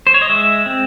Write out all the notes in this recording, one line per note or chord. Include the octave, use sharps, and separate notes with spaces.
C5
C#5
D#5
G#3 E5
C4